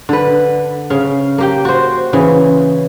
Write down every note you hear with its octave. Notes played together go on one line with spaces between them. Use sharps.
D3 B4
C#3 F5
A#3 G4 G5
F#4 C5
C#3 E3